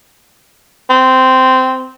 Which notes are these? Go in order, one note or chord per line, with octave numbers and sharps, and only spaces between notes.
C4